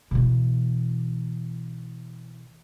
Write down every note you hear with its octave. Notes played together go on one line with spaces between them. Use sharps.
B2 E3